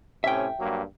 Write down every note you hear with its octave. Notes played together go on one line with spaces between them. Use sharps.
A2 C3 C#4 E5 G5
G2 F#3 A#3